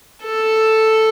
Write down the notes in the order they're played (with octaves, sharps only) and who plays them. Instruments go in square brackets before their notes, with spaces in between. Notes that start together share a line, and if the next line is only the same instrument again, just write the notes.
[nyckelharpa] A4